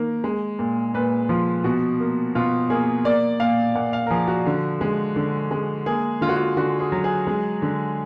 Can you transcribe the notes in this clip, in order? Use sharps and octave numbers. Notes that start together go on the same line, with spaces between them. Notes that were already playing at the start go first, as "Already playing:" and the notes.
Already playing: D#3 A#3
G#3
A#2
A#2 B4
F3 F4
B2 F#4
A#3
B2 F4
A#3 G#4
A#3 D5
A#2 F5
A#2 F#5
F5
A#4
F3 G#4
F#4
D3
G#3
D3
G#3
A#3 G#4
D3 F4
F#4
F4
D3 F#4
G#4
F#3
G#4
G#3
D3